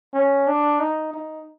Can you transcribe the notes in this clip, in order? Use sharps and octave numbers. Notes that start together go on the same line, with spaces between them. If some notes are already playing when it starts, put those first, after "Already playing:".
C#4
D4
D#4
D#4